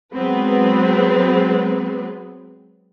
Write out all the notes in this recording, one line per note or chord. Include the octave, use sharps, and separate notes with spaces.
F#3 G#3 B3 C4 B4